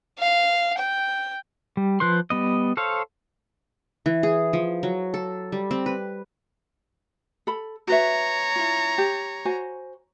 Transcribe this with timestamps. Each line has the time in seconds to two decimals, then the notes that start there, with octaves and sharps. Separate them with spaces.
0.19 F5
0.78 G5
1.77 G3
2.00 F3 B4 C5 C6
2.30 G3 B3 D#5
2.77 A4 C5 C#5 F5
4.06 E3
4.23 G#4
4.53 F3
4.83 F#3
5.14 A4
5.52 G3
5.71 C4
5.86 B4
7.47 A4 B5
7.87 F#4 B4 C#5 E5 A#5
8.56 E4 F4
8.98 G4
9.45 F#4 C5 G#5